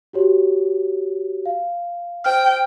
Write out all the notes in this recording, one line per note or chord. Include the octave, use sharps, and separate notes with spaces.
F#4 G4 C#5
F5
C5 G5 F6